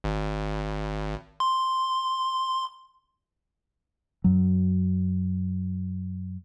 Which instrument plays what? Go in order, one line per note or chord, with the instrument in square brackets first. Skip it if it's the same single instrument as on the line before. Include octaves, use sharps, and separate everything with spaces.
[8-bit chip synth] G#1
C6
[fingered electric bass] F#2 F#3